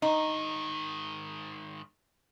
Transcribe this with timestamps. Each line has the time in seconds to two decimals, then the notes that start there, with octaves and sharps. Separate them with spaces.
0.02 G#2 D#3 D#4